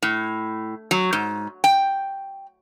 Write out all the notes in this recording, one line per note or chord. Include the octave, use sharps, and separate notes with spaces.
A2
F#3
G#2
G5